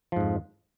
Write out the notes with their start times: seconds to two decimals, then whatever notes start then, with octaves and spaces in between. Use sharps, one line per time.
0.12 F3
0.16 G#2
0.21 F2